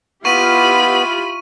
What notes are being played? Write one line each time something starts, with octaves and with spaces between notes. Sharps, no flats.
B3 E4 F4 G4 B5 C#6 D#7